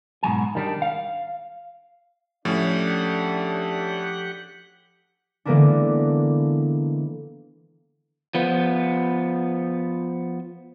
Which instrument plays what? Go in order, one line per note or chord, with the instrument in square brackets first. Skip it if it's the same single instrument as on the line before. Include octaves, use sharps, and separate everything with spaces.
[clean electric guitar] G#2 B2 F#3 G#5
D#3 G3 D4
F5
[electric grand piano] A2 C#4 [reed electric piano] F3 [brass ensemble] D4 A4 D5 [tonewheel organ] G4 F#5
[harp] D3 E3 G#3 A#3 B3 D4
[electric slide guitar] F3 B3